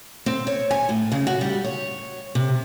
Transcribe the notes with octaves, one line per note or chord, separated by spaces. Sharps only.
C4
C#5
G#5
A2
C#3
F#4
G3
C#5
C3